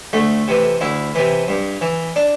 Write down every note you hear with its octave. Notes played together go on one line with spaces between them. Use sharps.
D2 A3
C3 E3
D2 E4
C3 E3
G2
E3
D4